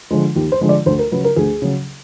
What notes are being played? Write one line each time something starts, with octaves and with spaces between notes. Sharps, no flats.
D3 F3 G#3
D#2 G4
C5
D3 F3 G#3
D5
D2 C5
A#4
C#3 F#3 B4
A#4
D2 G#4
C#3 F#3